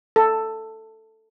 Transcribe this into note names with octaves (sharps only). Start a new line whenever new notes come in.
A4